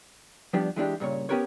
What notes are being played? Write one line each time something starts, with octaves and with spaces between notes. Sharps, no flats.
F3 G3 B3 D4 G4
E3 G#3 D4 G4
G2 A#2 C#3 C#5
B3 C#4 G4 A#4 B4 C#5